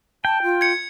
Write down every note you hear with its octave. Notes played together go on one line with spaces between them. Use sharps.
G5 A5
F4
G#6 C#7